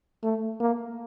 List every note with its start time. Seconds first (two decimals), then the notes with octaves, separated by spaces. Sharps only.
0.23 A3
0.60 A#3